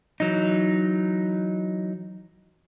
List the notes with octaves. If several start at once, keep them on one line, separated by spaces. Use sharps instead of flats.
E3 F#3 D#4